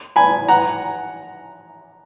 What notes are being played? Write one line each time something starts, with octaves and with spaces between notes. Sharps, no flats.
G#5 B5
F#5 A#5